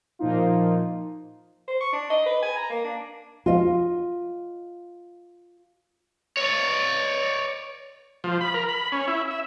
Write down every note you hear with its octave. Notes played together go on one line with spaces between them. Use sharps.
A#2 F3 A#3 D#4 F4
C5
C#6
D4
D#5
B4
G#5
A#5
A#3
D4
F4 D#5
C#5 D5
F3
B5
A#4
B5
C#4
E4
E5